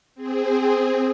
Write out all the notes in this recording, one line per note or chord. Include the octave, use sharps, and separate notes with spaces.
C4 G#4